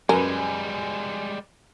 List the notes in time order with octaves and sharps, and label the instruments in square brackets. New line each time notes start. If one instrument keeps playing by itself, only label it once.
[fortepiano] F#2 B4 [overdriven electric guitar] G3 G#3 [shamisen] A#4 [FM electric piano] G#5